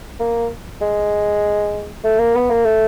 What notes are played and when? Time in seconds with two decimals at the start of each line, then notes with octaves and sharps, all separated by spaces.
0.20 A#3
0.82 G#3
2.04 A3
2.19 A#3
2.35 B3
2.50 A#3
2.65 A3